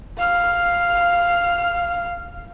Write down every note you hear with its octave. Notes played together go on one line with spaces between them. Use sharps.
F5 F6